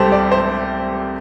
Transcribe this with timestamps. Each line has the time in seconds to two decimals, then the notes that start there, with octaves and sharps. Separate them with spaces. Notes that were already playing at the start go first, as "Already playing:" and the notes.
Already playing: C2 C3 G3 G4 A4 C5
0.12 D5
0.32 C5